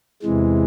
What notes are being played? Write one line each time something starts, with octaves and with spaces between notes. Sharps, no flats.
E2 C3 E3 G#3